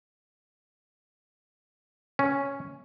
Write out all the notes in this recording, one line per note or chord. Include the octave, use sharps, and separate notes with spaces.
C#4